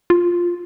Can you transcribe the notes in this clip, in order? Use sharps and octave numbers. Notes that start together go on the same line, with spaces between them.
F4